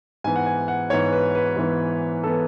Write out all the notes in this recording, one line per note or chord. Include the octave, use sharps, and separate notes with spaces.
G#2 E3 B3 G#5
F#5
G#5
F#5
G#2 E3 B3 C#5
B4
B4
G#2 E3 B3
E3 B3 A4